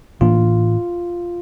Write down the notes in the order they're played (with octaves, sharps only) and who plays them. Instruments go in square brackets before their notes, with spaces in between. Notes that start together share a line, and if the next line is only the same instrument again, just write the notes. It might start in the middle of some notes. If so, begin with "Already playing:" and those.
[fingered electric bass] A2 E3 A#3 D4 [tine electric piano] F4